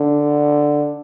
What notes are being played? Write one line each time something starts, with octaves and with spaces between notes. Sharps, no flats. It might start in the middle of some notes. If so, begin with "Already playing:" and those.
Already playing: D3